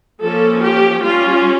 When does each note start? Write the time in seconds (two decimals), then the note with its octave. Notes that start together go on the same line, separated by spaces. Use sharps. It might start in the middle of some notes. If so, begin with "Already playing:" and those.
0.21 F3 A#3 C#4 A4
0.62 G4
1.01 G3 C#4 F4